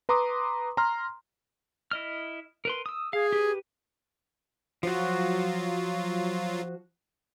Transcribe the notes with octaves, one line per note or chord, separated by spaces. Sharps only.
B4 A#5 C6 D6 D#6
A#5 C6 F6
E4 D#5 F6
A#4 B4 C6
D#6 E6
G#4 F5
G4 B4
F3 F#3 F4 F#4